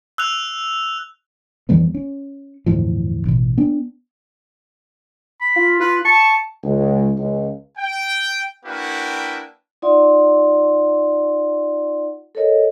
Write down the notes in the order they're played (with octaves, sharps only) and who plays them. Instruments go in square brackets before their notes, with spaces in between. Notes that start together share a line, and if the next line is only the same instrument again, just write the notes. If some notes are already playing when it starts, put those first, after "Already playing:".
[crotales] E6 F#6 F7
[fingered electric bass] F2 E3 G3 B3
C#4
G1 E2 A2 F3
A1 B2
B3 D4
[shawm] B5
[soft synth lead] F4
[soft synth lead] F4 [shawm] B4
[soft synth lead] A5 [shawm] C#6
[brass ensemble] C#2
C#2
[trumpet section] G5
A#3 D4 E4 F#4 B4 G5
[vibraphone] D#4 F4 D5 E5 F#5 C6
A4 A#4 C#5 D#5